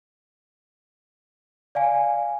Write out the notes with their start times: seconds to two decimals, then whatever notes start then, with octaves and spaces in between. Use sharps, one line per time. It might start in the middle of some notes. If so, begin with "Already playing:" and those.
1.75 D5 F5 G#5